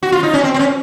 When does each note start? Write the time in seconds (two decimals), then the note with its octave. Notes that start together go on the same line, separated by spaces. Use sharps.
0.03 F#4
0.12 F4
0.23 D#4
0.33 C#4
0.44 C4
0.54 C4
0.59 C#4